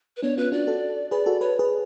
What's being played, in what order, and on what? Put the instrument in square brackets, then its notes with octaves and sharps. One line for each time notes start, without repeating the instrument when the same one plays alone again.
[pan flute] B4
[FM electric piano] B3 D4 [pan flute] C#5
[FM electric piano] C#4 F4 [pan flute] B4
[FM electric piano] D4 F#4 [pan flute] D5
[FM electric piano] F#4 A4
[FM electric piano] G#4 B4 [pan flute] D5
[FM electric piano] F#4 A4
[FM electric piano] B4 [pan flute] C#5
[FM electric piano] G#4 B4